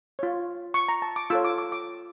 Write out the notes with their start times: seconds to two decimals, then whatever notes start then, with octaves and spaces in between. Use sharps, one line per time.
0.19 F4 C#5
0.74 C#6
0.89 A#5
1.02 A5
1.16 D6
1.30 F4 A4 C#5 E6
1.45 D6
1.58 D6
1.72 D6